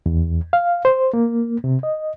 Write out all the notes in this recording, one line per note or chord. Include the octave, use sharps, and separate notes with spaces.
E2
F5
C5
A#3
C3
D#5